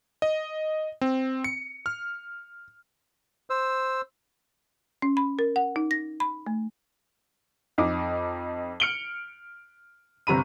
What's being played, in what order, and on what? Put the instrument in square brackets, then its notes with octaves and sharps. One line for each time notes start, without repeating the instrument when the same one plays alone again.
[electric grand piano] D#5
C4
C#7
F6
[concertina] C5 E6
[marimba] C#4
B5
A#4
F#5
D#4
A#6
B5
A3
[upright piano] F2 D#4 D6
F6 C#7 D7 F#7 G7
G1 C3 A#5 B5 D#7